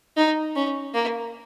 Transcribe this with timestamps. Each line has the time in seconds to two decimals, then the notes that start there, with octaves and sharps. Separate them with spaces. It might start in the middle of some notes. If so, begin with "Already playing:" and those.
0.17 D#4
0.56 C#4
0.95 A#3